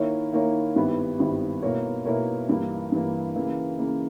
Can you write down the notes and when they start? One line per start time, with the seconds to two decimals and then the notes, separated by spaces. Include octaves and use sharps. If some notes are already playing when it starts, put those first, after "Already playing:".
Already playing: D#3 A#3 E4 A#4 C#5
0.33 D#3 A#3 E4 A#4 C#5
0.76 G#1 G2 G3 B3 E4
1.19 G#1 G2 G3 B3 E4
1.62 B2 A#3 E4 A#4 C#5
2.05 B2 A#3 E4 A#4 C#5
2.49 G2 E3 A#3
2.92 G2 E3 A#3
3.36 C#3 E3 A#3
3.78 C#3 E3 A#3